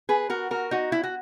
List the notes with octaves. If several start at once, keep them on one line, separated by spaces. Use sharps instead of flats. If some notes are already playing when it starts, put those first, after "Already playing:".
G#4 B4
F#4 A#4
F#4 A#4
D#4 F#4
E4
F#4